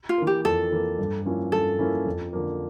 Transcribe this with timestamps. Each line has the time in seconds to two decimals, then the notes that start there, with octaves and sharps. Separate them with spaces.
0.09 F4
0.18 E3 A#3
0.27 G4
0.45 F2 A4
0.72 E3 A#3
0.99 G2
1.26 F3 A#3 C#4 E4
1.52 G2 A4
1.79 F3 A#3 C#4 E4
2.06 F2
2.33 D3 F3 A#3